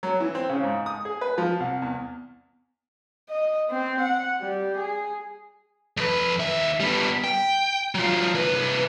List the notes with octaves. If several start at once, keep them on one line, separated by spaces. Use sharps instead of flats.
F#3
E3
C4
C#3
G#2
D#6
G#4
B4
F3
C2
E2
D#5
C4
F#5
G3
G#4
F2 B4
D#2 E5
G3 B3
G5
F#3 F4
C2 B4